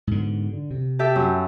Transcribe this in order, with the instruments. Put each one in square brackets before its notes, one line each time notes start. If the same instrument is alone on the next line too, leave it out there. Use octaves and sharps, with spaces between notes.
[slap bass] G#2 B2 D3
D3
C3
[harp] G4 A4 E5
F#2